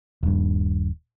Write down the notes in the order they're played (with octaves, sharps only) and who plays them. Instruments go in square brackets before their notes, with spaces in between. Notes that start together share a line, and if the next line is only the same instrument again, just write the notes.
[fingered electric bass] D#1 G2